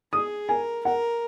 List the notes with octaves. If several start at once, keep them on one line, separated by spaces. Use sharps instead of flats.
G#4 D#6
A#4 G#5
A#4 F#5